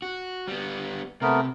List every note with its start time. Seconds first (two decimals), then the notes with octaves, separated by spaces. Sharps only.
0.02 F#4
0.48 G3 B3
1.22 C3 A3 B3 A#4